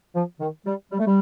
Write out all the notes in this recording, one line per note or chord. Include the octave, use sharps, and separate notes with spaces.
F3
D#3
G3
G3
A3
G3